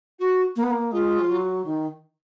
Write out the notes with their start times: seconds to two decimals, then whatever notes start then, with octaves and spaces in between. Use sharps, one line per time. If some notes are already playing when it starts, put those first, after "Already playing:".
0.19 F#4
0.56 A#3
0.63 B3
0.71 A#3
0.92 G#3 F4
1.19 F3
1.29 F#3
1.65 D#3